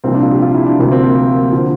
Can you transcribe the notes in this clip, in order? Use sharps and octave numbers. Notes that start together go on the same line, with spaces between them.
C2 A#2 F3 C4
D4
F4
G4
F4
E4
D4
D2 C3 F3 A#3
C4
A#3
A#3
D3 F3